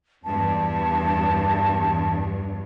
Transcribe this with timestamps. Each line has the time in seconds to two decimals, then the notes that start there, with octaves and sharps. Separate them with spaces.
0.24 E2 G2 A5